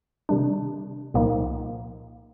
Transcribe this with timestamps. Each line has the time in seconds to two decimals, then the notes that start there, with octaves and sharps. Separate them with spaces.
0.29 C3 D#3 G3 D4
1.14 C2 A#2 F3 A#3 D#4